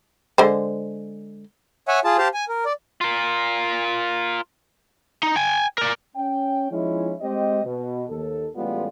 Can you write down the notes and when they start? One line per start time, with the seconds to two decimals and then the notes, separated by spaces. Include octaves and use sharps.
0.38 D3 G#3 C5
1.88 C#5 E5 F#5 G#5
2.05 F4 G#4 A5
2.18 G4 C5 F5 A5
2.34 G#5
2.49 A#4
2.65 D5
3.01 F4 A#4
5.23 D#4
5.36 G5 G#5
5.78 A#4 D5
6.16 C#4 G5
6.71 F3 G#3 C#4 D#4 E4
7.21 G#3 C4 G4 C5 D#5
7.65 B2
8.09 D#2 A4
8.55 A1 A2 G3 G#3 B3 F4